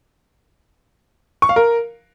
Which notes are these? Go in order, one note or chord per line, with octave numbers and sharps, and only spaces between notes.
C#6
F5
A#4